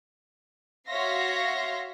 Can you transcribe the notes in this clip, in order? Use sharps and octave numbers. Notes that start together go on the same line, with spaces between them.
F#4 C#5 E5 F5 C6 A#6